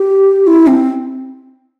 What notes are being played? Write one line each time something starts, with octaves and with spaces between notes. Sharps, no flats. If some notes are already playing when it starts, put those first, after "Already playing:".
Already playing: G4
E4
C4